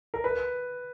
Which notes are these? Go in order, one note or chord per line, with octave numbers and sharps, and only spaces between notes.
A#4
B4